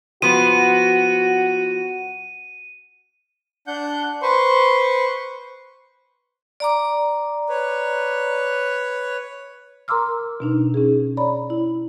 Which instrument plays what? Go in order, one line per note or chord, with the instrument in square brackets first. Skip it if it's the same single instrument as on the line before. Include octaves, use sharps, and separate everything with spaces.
[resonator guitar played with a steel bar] F3 B3 [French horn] F#4 [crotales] D#7
[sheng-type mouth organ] D4 F#5 G6
B4 C5 C6 C#6
[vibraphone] D5 A#5 D6
[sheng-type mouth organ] B4 C#5
[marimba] A#4 A#5 C6 D6 E6 F6
B2 D4 D#4
C#4 D#4 G#4
C#5 D5 A#5 B5
E4